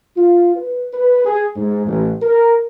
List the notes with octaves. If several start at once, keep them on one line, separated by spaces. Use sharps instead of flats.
F4
B4
B4
G#4
G#2
A1
A#4